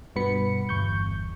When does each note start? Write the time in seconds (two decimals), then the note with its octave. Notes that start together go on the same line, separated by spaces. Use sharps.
0.16 G2 B2 B3 B5 C#7
0.69 G1 E2 C#6 G6